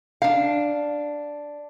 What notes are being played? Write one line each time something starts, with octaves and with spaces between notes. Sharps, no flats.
D4 F5